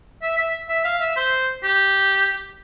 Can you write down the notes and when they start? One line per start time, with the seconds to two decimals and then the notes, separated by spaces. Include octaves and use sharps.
0.22 E5
0.38 E5
0.69 E5
0.85 F5
1.01 E5
1.17 C5
1.63 G4